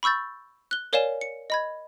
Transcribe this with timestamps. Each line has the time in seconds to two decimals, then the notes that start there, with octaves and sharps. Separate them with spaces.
0.03 B5 C#6 E6 G6 A6
0.71 F#6 G7
0.93 A#4 C#5 D5 F5 G#5 E7
1.21 C#7
1.50 D#5 B5 G#6